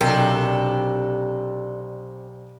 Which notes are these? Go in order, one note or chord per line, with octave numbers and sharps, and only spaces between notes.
B1 C3 D4 A4 A#4 G5